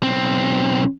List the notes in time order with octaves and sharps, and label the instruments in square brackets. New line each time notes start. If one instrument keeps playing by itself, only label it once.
[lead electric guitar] B1 C4